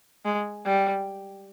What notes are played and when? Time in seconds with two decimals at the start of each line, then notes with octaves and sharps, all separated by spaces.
0.25 G#3
0.65 G3